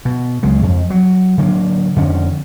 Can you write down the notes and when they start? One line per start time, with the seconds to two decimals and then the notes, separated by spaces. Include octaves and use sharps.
0.05 B2
0.43 C#2 C#3 F#3 G#3
0.63 F2
0.90 F#3
1.38 D3 F#3 G3 A#3
1.96 F2 D3 C#4